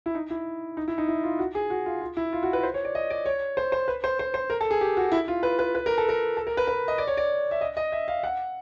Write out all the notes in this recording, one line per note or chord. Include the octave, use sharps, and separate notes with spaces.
E4
D#4
E4
D#4
E4
D#4
E4
F4
F#4
G#4
F#4
F4
F4
E4
F4
F#4
B4
C5
C#5
D5
D#5
D5
C#5
C5
C5
B4
C5
C5
C5
A#4
A4
G#4
G4
F#4
E4
F4
B4
B4
B4
A#4
A4
A#4
A4
A#4
B4
B4
D#5
D5
C#5
D5
E5
D#5
D#5
E5
F5
F#5